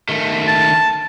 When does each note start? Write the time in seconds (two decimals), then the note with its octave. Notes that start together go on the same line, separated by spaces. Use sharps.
0.09 D#3 A3
0.48 A5